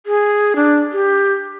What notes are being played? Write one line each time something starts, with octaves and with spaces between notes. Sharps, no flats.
G#4
D4
G4